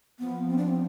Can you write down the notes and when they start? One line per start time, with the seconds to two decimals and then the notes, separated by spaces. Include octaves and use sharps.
0.19 F3 B3
0.48 F3 C4
0.58 D4
0.68 C4